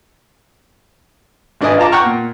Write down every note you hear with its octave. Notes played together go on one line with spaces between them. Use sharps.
G#1 D4 B4 D#5 G#5
F4 A5 A#5 D6
F#5 G5 A#5 C#6 F6
A#2